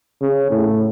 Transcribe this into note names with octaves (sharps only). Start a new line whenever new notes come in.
C#3
A2